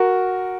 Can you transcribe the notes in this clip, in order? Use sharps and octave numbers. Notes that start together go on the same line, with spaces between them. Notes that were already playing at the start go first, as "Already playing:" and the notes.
Already playing: F#4 A#4